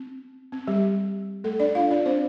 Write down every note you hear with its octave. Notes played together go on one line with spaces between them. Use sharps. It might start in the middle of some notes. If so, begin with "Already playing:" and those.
Already playing: C4
C4
G3 G4
A3 A4
D4 D5
F4 F5
D4 D5
C4 C5